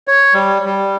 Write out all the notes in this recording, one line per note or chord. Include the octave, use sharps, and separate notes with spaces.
C#5
G3
G3